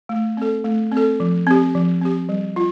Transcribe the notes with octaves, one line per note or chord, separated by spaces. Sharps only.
A3
C4 A4
A3
C4
A4
F3
C4 G4
F3
C4 G4
G3
F4